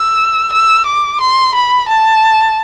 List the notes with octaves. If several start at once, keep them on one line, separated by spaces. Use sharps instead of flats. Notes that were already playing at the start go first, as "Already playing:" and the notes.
Already playing: E6
E6
D6
C6
B5
A5